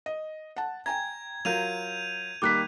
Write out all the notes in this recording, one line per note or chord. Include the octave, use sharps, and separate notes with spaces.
D#5
F#5 A5
G5 G#5 A#5 G#6
F#3 F4 A#4 G6 D#7 F7
D#3 G3 A#3 D6 F#6 B6